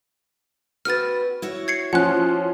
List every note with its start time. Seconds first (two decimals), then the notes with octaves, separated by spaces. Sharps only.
0.85 C4 F#4 B4 F6 A6
1.42 E4 F#4 C#5
1.68 G#6 C7 C#7
1.93 F3 C#4 F#5 F#6